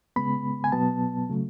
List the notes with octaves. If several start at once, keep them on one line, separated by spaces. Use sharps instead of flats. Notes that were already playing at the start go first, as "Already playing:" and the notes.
C#3 G#3 B3 B5
G#5
B2 F#3 B3 A5
C#3 F#3 A3